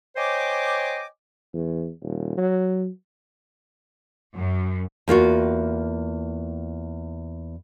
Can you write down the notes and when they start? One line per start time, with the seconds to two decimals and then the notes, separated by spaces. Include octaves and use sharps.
0.16 C5 C#5 D#5 G5 G#5 D6
1.53 E2
2.02 D#1
2.37 F#3
4.36 F#2
5.08 E2 A#3 F4 F#4